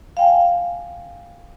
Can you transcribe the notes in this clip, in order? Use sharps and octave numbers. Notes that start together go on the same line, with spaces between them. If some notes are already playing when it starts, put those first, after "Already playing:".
F5 G5 G#5